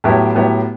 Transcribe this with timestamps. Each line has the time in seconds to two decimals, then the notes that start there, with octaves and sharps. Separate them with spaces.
0.04 A2 F#3 B3 E4 G4
0.35 A2 F#3 B3 E4 G4